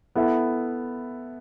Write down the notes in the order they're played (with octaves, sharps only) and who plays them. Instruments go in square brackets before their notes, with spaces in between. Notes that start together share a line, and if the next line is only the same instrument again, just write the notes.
[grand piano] B3 E4 A4 E5